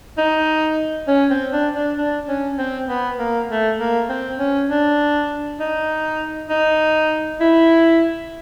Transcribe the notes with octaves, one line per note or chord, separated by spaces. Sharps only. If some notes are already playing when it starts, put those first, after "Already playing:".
D#4
C#4
C4
D4
D4
D4
C#4
C4
B3
A#3
A3
A#3
C4
C#4
D4
D#4
D#4
E4